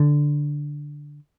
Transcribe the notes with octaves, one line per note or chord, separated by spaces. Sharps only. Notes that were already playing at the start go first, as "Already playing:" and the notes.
Already playing: D3